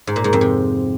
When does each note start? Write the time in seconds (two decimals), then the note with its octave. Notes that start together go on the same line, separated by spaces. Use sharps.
0.07 G#2
0.16 A#2
0.24 G#2
0.33 F2
0.41 C3